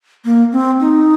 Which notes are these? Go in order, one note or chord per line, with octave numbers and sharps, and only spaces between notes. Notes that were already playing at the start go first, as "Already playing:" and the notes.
A#3
C4
D#4